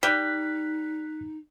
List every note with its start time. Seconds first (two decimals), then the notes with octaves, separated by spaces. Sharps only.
0.03 G3 D#4 F#6 B6